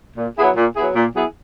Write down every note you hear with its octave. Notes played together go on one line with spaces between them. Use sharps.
A#2
F#3 B3 E4 G#4
A#2
F#3 B3 E4 G#4
A#2
F#3 B3 E4 G#4